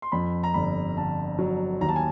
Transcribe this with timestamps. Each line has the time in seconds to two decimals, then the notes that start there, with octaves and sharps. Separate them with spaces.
0.02 C6
0.12 F2 B5
0.43 A#5
0.54 G1 B5
0.97 D3 A5
1.39 F#3
1.81 D#2 A#5
1.89 A5
1.96 G#5